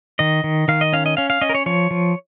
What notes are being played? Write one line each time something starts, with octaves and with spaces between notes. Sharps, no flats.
D#3 D#5
D#3
D#3 F5
D#5
C#4 F5
D#5
C#4 F5
F5
C#4 D#5
A#4
C#5
F3 C#5
F3